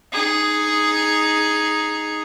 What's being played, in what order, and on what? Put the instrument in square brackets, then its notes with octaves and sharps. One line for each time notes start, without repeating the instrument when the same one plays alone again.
[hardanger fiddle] D#4 G#4